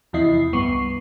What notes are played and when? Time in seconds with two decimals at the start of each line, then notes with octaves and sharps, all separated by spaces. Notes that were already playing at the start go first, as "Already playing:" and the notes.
0.13 E2 C3 F3 E4 D#5 C7
0.53 C2 G2 B3 C#6 C7